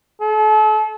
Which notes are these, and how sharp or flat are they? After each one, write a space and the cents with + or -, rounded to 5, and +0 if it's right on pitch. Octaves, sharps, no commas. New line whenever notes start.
A4 -40